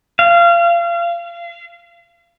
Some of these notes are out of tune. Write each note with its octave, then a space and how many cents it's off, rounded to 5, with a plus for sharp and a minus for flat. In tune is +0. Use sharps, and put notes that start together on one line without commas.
F5 -30